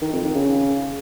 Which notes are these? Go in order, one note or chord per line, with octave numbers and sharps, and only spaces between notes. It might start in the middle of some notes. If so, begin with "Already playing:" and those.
D#3
F2
D#3
C#3